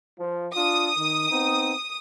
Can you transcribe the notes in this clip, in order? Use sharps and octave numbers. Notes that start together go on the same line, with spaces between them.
F3
D4 F4 D#6
D#3
B3 C4 D#4